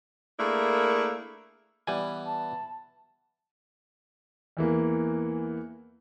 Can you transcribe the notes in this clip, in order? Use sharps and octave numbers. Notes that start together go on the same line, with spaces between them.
A3 A#3 D4 E4 G#4 A#4
E3 G3 B3 G#5
A5
E2 E3 A#3